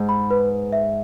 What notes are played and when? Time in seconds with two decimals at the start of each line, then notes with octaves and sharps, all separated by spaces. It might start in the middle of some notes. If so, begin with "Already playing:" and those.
Already playing: G#2
0.09 B5
0.31 B4
0.52 B4
0.73 E5